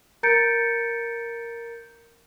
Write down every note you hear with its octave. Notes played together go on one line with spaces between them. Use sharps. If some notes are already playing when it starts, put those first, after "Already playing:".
A#4 A#5 G6 A6 C#7 D7